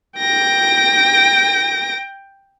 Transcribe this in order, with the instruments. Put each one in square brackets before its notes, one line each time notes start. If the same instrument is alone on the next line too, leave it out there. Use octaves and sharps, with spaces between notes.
[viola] G5 [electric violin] A#6 D7